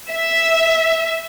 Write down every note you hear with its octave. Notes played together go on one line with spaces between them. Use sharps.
E5